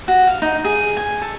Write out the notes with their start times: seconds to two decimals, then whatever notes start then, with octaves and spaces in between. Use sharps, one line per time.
0.08 F#4
0.27 F5
0.42 D#4
0.64 G#4
0.97 G#5
1.22 A4